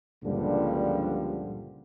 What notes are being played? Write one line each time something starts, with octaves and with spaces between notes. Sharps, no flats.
C#2 G2 A#2 D3 F3 G3